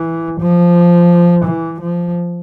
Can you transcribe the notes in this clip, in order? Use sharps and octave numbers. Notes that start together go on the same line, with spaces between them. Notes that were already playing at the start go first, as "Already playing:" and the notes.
Already playing: E3
F3
E3
F3